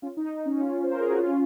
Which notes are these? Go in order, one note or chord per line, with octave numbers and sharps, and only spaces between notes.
C#4 F4
D#4
C#4
D#4
C#4 F4
C5
A#4
G#4
F#4
C#4 F4